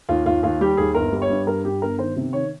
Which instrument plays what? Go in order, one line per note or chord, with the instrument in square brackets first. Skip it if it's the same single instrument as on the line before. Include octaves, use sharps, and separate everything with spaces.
[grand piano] D#2 F4
D#2 F4
D#2 F4
G3 G4
D#2 G#4
G1 A#4
G3
C#5
G2
G3 A#4
G2 G4
G1 A#4
D#3 C5
C3
D#3 C#5